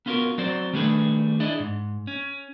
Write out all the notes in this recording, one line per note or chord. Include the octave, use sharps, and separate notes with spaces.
B3 C#4 F4 F#4 G#4 A#4
F#3 C4 F#4 C5 D5
D#3 G3 A3 D4 G#4 B4
D4 E4 G#4 D5 D#5
G#2
C#4